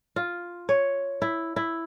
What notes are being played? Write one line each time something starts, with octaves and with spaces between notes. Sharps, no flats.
F4
C#5
E4
E4